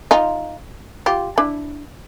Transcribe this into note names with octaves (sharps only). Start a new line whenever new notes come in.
D#4 F4
F4 G4
D4 E4